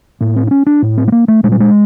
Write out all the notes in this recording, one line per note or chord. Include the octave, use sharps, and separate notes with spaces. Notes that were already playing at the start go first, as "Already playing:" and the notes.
A2 A#3
C4
D4
C#4
D4
A2
C4
A3
A#3
A3
A#2 G#3
G3
G#3